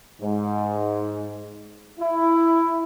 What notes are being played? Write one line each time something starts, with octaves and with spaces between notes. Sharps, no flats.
G#2
E4